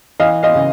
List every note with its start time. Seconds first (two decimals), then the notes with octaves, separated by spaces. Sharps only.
0.20 E3 D#5 F5
0.43 D#5 F5
0.55 C#3